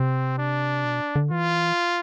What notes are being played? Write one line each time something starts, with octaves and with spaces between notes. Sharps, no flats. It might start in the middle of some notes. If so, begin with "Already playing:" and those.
Already playing: C3 C4
D4
B2
D3
E3 F4